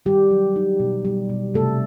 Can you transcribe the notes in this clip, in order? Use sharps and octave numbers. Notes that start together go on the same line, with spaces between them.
D#3 G3 G4
F#3
D#4
B2
G3
B2
C3 A3 A4